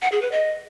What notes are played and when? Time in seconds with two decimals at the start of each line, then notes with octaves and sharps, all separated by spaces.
0.02 F#5
0.12 G#4
0.22 B4
0.32 D#5